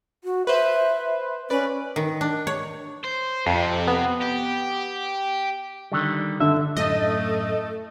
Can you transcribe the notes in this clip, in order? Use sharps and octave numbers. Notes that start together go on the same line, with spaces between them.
F#4
B4 C5 E5
C#4 B4 D5
D#3
D4
C#5
C5
F2 C3
B3
G4
D3 D#3 G3
D3 E5
F#2 A2 A3 A4 D#5